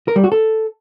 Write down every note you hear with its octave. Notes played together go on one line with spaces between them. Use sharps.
A#4
G3
F#4
A4